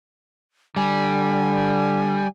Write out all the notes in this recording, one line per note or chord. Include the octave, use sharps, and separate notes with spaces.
D3 G3 G#5